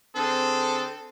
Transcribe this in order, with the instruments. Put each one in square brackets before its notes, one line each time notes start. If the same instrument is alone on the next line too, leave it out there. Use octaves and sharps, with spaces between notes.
[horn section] D3 C4 G#4 A4